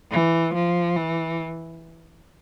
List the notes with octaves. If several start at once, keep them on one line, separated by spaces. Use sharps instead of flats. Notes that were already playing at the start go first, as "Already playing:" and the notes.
E3
F3
E3